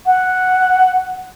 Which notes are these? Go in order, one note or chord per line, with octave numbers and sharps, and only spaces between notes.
F#5